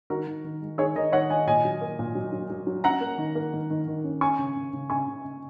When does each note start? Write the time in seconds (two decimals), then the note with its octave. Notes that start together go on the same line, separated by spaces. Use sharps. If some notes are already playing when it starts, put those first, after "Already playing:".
0.10 D#3 F#4 A#4
0.27 D#3
0.44 D#3
0.61 G#3
0.78 D#3 G#4 C#5
0.96 D#3 A#4 D#5
1.12 D#3 C#5 F#5
1.30 D#3 D#5 G#5
1.47 A#2 D#5 G#5
1.65 F#3
1.81 A#3
1.99 A#2
2.15 F#3
2.32 F#3
2.50 F#3
2.67 F#3
2.84 C#4 F#5 A#5
3.01 A#3
3.18 D#3
3.35 A#3
3.53 D#3
3.70 D#3
3.87 D#3
4.04 C#4
4.21 C#4 G#5 C#6
4.39 C#3
4.56 C#3
4.73 C#3
4.90 C#3 G#5 C#6
5.07 C#3
5.25 C#3